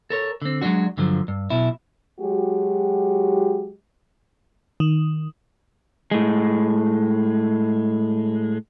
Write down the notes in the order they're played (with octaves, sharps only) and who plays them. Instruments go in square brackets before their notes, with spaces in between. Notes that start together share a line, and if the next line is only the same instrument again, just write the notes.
[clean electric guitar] A4 A#4 C#5
D3 C4
F#3 G#3 B3 D4 F#4
G2 D3 F3 F#3
G2
B1 B2 E4
[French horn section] F#3 G#3 F#4 G4
[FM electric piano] D#3
[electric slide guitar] A2 G#3